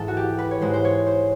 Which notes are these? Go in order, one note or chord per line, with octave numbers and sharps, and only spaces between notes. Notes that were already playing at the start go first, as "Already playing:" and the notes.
Already playing: G#2 E3 G#3 A4
F#4
G4
B4
C#5
G#2 E3 G#3 C5
C5
C#5
C5